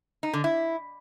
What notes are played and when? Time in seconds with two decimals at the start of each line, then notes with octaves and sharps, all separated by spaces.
0.23 D#4
0.33 D3
0.44 E4